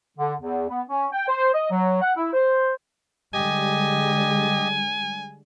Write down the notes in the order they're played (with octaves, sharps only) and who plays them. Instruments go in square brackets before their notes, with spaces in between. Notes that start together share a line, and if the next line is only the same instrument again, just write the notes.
[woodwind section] D3
E2
B3
C#4
G5
C5
D#5
F#3
F#5
E4
C5
[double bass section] D3 G3 G#3 [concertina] G4 D#5 [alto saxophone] G#5